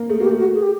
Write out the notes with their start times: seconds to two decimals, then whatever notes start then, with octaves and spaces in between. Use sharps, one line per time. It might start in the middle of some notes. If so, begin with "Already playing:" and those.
Already playing: A#3
0.09 A3 G#4
0.19 A#3 F#4 G4
0.31 A3
0.39 F#4
0.54 G#4
0.62 G4